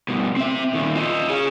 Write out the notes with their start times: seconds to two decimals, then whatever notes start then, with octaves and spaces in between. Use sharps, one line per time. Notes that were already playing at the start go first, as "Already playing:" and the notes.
0.08 G2 B2
0.37 C4 E5
0.73 A#2 D#3
0.95 F4 D#5
1.30 G#4 C#5